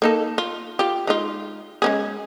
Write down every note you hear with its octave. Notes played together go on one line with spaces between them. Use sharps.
A#3 D#4 A4
F4
F4 G4
G#3 D#4 F4
G#3 C#4 G#4